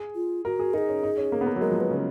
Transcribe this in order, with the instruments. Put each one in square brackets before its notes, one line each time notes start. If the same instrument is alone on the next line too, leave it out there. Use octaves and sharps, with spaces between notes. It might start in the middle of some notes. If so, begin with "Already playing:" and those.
Already playing: [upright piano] G#4
[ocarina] F4
[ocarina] F#4 [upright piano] A#4
[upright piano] G#4
[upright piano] D#4 [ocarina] A#4
[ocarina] G#4
[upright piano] C#4
D#4
C#4
A#3
B3
A#3
F#3
[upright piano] G#3 [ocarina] A#4
[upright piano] F3
F#3
[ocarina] B4
[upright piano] C#3